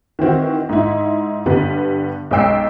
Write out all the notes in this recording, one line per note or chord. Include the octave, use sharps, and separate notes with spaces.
D#3 E3 C4 F#4
G#2 D#4 E4
G2 D3 G3 B3
B1 G#3 C#4 G5 E6 C7